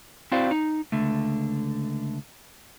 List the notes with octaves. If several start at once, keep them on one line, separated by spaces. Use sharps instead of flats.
C4 E4 F#4 C5 D5 F5
D#4
C#2 D3 A3